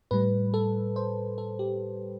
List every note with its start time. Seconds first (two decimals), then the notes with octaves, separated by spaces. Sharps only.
0.11 A2 G3 B4
0.54 A4
0.96 C5
1.38 A4
1.59 G4